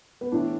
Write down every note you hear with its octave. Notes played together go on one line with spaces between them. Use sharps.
B3
A2 E3 D4